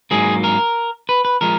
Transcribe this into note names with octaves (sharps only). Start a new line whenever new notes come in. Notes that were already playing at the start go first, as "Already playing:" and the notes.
G#2 F#3 A#3 G#4
A#4
B4
B4
F3 G#3 A#4